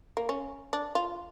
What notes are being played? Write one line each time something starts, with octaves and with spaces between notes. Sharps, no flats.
A#3
C#4
D4
F4